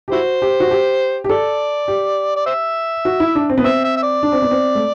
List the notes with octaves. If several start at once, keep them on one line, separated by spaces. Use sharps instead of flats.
G4
E4 F#4 C5
G4
F#4
G4
G4
A4 D5
G4
D5
C5 E5
F#4
E4
D4
C4
B3
C4 E5
E5
E5
D5
D4
C4
B3
C4
A3